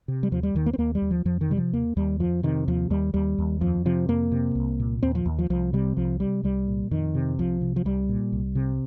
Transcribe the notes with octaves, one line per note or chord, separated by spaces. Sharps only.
C3
G3
D#2 F3
G3
D#2 D#3
A#3
C4
D#2 A#3
G3
D#2
F3
F2 F3
D#3
C3 G3
F3
D#2 A#3
D#2 G3
F2 F3
C3 D#3
D#2 F3
D#2 G3
D#2 G3
D#2
F2 F3
C3 F3
F2 A#3
C3
C2
A#2
D#2 C4
F3
D#2
F3
C2 F3
C3 G3
C2 F3
C3 G3
C2 G3
A#2
F2 D#3
C3
C2 F3
C3
F3
C2 G3
A#2
C2
C3